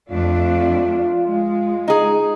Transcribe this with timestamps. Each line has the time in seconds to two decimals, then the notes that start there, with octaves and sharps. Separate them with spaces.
0.10 F2 A3 D4 F4
1.26 G#3
1.88 D#4 G#4